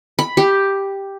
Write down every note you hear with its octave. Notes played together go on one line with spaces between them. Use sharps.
B5
G4